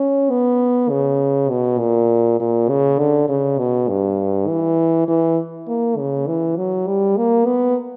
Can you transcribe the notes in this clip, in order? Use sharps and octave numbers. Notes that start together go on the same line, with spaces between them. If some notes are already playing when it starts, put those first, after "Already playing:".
Already playing: C#4
B3
C#3
B2
A#2
A#2
C#3
D3
C#3
B2
G2
E3
E3
A#3
C#3
E3
F#3
G3
A#3
B3